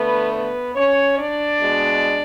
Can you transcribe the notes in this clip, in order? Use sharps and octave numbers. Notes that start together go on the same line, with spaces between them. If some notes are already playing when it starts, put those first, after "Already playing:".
Already playing: D3 A3 B3 B4
B3 B4
C#4 C#5
D4 D5
B2 G#3